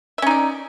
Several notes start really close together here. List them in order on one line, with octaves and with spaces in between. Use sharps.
E5 C#4 D#4 D5